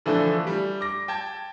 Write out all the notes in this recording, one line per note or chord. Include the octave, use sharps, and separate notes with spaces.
D3 E3 F3 A3 D4
G3
D6 A#6
G5 A5 G#6